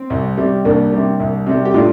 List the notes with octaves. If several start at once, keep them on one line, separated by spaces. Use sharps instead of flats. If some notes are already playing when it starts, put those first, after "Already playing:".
Already playing: C4
C2
C3 G3
C2 A#3 D4
C3 G3
C2
C3 G3
G4
A2 D4 F4